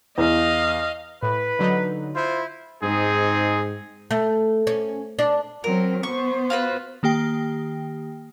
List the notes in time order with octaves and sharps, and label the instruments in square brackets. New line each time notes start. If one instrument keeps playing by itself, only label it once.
[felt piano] E2 [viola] D#5 F5
[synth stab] A2 [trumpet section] B4
[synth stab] D3 F#3 D#4
[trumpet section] E4 F4 C5
[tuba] G#2 [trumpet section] C4 D#4 G#4
[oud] A3
C#4
D4
[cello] F#3 C4 [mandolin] A#4
[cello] B3 C5 [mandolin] C#6
[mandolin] F4 F#4 B4
[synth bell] D#3 A#3 G4 G5